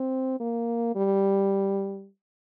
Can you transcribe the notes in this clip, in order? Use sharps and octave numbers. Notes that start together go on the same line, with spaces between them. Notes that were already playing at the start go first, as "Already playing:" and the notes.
Already playing: C4
A#3
G3